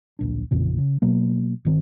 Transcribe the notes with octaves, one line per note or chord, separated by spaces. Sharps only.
D1 A#1 D4
A1 F2 A#2 C#3
C#3
B2 F#3 A#3
G1 D#3 C4